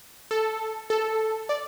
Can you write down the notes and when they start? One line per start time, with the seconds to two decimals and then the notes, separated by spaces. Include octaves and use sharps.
0.31 A4
0.90 A4
1.49 D5